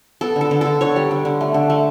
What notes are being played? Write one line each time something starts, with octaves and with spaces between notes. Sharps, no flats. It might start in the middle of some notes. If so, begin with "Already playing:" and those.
B3 A4
D3
A4
D3
D3 A4
D3 C#5
G3
D3
D3
A3
D3
A3